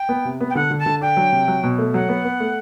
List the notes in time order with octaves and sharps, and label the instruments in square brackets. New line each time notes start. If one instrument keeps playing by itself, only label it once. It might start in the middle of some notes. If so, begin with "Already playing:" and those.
Already playing: [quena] G5
[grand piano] B3
C3
B3
[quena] G5
[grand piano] D3 [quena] F#5
[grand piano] D3
[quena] A5
[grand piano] D3
[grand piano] D4 [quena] G5
[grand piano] F#3
C3
F#3
B2
A3
[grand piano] F#3 [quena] F#5
[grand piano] B3
B3
A3